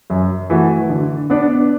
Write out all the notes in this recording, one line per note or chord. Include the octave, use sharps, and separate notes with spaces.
F#2
E3 A3 F#4 A4
D3
B3 D4